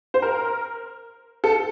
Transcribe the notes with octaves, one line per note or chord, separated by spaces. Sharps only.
C5
A#4
A4